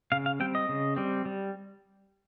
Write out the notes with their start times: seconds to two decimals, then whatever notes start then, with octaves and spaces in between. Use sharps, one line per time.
0.12 C#3 F5
0.26 F5
0.40 G3 C4 G5
0.55 D#5
0.69 C#3
0.96 G3 C4
1.25 G3